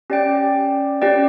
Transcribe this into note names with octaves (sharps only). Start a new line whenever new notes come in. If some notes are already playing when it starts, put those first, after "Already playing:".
C#4 G4 D5 G5
C#4 G4 D5 G5